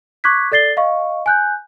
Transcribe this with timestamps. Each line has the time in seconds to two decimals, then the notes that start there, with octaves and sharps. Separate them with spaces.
0.24 C#6 D6 F#6 G#6 B6
0.52 A4 D5 A6 C7 G7
0.77 D#5 F5 C#6
1.26 G#5 F#6 G6